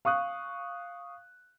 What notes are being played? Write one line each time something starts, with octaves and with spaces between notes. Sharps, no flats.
F5 C#6 D#6 F#6